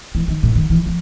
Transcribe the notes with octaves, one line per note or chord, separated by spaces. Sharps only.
E3
D#3
A2
D#3
E3
F3